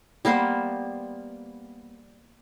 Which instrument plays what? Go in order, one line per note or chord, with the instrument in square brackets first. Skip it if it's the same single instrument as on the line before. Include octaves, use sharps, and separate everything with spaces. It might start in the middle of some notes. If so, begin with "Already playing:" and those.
[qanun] G3 A#3 B3 C5